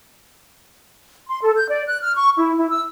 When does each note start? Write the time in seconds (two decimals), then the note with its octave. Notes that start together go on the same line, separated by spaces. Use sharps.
1.28 C6
1.42 A4
1.56 G6
1.70 D5
1.87 F#6
2.02 F6
2.16 C#6
2.36 E4
2.57 E4
2.70 E6